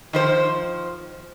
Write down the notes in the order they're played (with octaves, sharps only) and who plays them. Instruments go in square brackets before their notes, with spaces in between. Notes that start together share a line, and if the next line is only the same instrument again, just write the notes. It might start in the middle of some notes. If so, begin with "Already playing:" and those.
[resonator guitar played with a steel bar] D#3 F3 C5